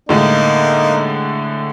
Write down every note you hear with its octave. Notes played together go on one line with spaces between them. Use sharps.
A2 D3 G#3 A#3 D#4